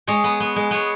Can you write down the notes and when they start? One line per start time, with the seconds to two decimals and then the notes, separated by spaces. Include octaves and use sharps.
0.07 G#3 G#4 C#5
0.24 B3
0.40 B3
0.56 G#3
0.71 B3 G#4 C#5